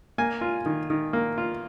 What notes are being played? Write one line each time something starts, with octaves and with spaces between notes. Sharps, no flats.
A#3 G#5
F4
D#3
D#3
A#3
F4